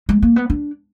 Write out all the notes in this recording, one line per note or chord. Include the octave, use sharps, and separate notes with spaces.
G#3
A#3
B3
D4